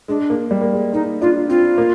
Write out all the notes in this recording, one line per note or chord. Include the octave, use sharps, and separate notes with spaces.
G#3 D4
A#3
G3
A#3
G#3
A#3 D#4
D4 F4
C4 F4
A#3